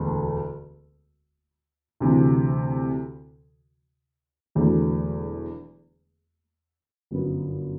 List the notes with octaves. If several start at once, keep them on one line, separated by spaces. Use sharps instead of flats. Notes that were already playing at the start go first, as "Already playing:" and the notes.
Already playing: E1 D2 A3
D2 C3 E3
E1 E2 D3 F#3 A3
G1 F#2 F#3 B3